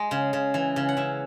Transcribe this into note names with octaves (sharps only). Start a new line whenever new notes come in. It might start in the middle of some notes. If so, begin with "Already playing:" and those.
Already playing: G#3 D#5
C#3
C#3
E3
C#3
F#5
C#3 E5